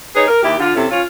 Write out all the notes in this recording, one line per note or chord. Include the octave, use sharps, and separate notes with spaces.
D#4 G#4 B4 C#5
A#4
D#2 E4 G4
D3 F4
C3 C#4 E4 A4
C#4 F4